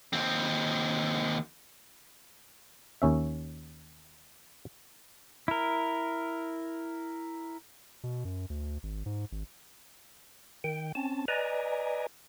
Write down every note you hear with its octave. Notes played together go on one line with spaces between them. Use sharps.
D#2 C4
D#2 C#4 E5
E4 A#4
B2
F#2
D2
G#1
G#2
G#1
D#3 G5
C4 C#4 A5
B4 D5 D#5 G#5 A#5